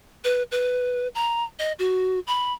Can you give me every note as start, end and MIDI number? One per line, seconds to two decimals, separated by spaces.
0.24 0.43 71
0.52 1.08 71
1.15 1.44 82
1.59 1.72 75
1.79 2.20 66
2.27 2.53 83